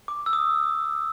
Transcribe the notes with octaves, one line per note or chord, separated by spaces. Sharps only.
D6
E6
D#6